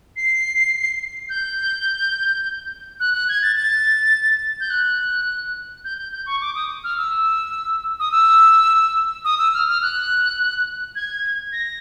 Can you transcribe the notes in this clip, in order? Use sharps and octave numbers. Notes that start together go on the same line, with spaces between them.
C7
G6
F#6
F#6
G#6
A6
A6
G6
F#6
G6
G6
G6
C#6
D6
D#6
F6
E6
D#6
E6
D#6
E6
F6
F6
F#6
G#6
A#6